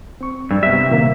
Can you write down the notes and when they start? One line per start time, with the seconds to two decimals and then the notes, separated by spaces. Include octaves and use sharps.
0.21 C4 C#6
0.51 G2 E6
0.63 C3 G3 B3 E5
0.90 A#2 D#3 A#3